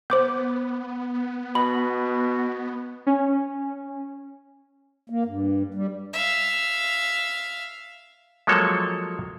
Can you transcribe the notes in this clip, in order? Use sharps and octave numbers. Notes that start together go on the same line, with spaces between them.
B3 C5 D6 G6
B2 B5
C#4
A#3
G2
G3
E5 F5
F3 F#3 G#3 A#3 A4 C#5